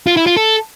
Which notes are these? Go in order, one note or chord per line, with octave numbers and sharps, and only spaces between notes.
F4
E4
F4
A4